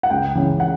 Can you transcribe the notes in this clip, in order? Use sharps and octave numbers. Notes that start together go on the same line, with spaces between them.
F#5
C#2 G5
C#3 E3
F#5